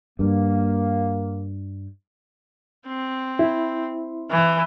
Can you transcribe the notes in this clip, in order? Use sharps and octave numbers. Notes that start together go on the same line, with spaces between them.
G2 A#3
C4
E4
E3